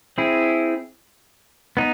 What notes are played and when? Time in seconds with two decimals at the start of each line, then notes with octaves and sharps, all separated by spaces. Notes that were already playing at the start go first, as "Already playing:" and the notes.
0.18 C4 E4 G#4
1.77 B3 D#4